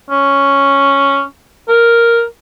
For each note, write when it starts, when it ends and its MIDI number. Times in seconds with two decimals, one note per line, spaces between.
0.10 1.23 61
1.69 2.24 70